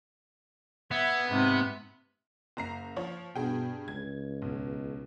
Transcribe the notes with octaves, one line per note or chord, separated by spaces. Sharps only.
B3 E5 G#6
G#2 C3
F#1 A#5 C7
F3 C#5
G2 B2 G#4 G5
C#2 G#6
B1